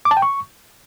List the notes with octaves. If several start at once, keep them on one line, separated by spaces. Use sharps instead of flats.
D6
A5
G5
C#6